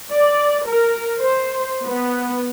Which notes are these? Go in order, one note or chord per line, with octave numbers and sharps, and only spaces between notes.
D5
A#4
C5
B3